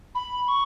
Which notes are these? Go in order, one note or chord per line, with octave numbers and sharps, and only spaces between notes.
B5
C#6